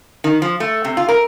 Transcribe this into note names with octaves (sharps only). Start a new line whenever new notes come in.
D#3
F3
A3
C3
F4
A#4